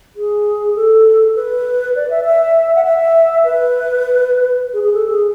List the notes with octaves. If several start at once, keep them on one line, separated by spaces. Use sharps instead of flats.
G#4
A4
B4
D5
E5
E5
F#5
E5
B4
G#4
G#4
A4
G#4